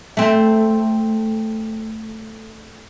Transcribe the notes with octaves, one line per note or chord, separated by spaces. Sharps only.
A3 C4